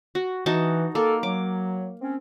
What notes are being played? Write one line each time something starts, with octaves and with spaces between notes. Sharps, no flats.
F#4
E3 D#4 F#4 A5
A#3 A4
F#3 D6
C4 C#4